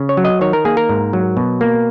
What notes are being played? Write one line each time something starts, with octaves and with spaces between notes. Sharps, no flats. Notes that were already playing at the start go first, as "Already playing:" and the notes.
Already playing: C#3
C#5
F#3
D#5
D#3 C#5
A#4
A#3 G#4
A#4
G#2
F#3
B2
A#3